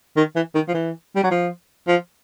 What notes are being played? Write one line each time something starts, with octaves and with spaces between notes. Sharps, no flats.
D#3
E3
D#3
F3
E3
G3
F#3
F3
F3